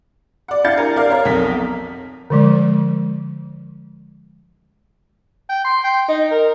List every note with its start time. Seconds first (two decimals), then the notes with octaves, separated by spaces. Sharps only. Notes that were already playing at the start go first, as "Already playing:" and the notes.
0.48 D5 F#5
0.64 D4 E4 F5 G6 A6 C#7
0.77 A#4 G#5 A#5
0.96 A#4 D5 F5
1.09 A#4 C#5 F5 A#5
1.25 B1 F2 A#4 B6
2.30 D3 F3 G#3
5.50 G5
5.65 C6
5.84 G5
6.08 D#4
6.32 A#4